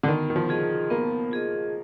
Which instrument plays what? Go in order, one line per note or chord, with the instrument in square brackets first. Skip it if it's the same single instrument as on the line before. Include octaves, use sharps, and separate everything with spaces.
[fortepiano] D3
[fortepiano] D#3 [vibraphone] B3
[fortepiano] D#3
F3
[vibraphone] F4 G#4 D#5
[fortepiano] A#3 [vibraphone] B3
[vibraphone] F4 G#4 D#5